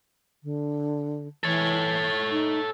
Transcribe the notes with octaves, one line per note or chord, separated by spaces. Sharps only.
D3
E3 A4 C#5
D#4